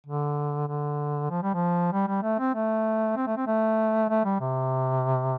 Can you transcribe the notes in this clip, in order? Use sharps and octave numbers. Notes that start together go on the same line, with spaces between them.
D3
D3
F3
G3
F3
G3
G3
A3
C4
A3
C4
A3
C4
A3
A3
G3
C3